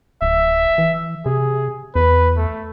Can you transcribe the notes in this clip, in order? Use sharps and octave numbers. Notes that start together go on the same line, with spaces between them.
D1 E5
E3
C3 G#4
E2 B4
A3